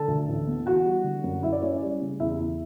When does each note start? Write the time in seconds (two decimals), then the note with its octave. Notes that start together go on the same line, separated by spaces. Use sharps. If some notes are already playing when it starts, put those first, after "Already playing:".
Already playing: D3 A4 A5
0.08 D2
0.28 A1
0.47 B3
0.66 E3 F#4 F#5
0.85 G3
1.04 D3
1.24 F#2
1.43 E4 E5
1.53 D5
1.62 C#4 C#5
1.72 D5
1.82 G3
2.02 C#3
2.20 E2 E4 E5
2.39 E2